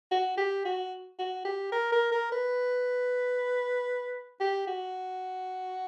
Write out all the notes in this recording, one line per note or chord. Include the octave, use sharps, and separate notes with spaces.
F#4
G4
F#4
F#4
G4
A#4
A#4
A#4
B4
G4
F#4